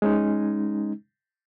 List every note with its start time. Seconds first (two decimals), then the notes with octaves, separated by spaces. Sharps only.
0.02 G#3 C#4 D#4